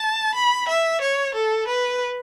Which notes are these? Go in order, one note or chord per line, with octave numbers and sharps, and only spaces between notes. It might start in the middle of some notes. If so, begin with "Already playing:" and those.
Already playing: A5
B5
E5
C#5
A4
B4